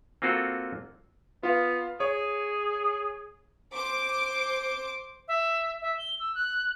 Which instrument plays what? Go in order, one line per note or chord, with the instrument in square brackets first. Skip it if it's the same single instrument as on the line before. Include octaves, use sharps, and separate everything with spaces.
[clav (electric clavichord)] A#3 C4 F4 F#4 A4
[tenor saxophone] B3 [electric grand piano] F4 F5
[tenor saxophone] G#4 [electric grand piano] C#5
[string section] C5 D6
[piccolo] E5
E5
G7
E6
F#6